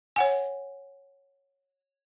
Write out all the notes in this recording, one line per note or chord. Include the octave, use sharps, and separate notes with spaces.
C#5 F#5 G#5